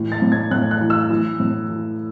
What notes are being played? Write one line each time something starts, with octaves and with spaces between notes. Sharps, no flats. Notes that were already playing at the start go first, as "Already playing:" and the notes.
Already playing: A2 E3
A6
A2
G#6
A2 F#6
F#6
E3
E6
E3
A2
E3